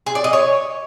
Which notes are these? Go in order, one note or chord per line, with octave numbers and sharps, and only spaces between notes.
G#4
D5
D#5
C#5